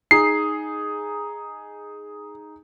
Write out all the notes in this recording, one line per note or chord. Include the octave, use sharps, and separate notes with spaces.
D#4 G#4 C7